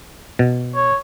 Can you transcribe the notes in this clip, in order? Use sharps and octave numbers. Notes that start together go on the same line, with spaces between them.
B2
C#5